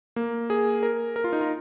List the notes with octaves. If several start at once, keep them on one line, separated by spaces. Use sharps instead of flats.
A#3
G#4
A#4
A#4
F4
D#4
F4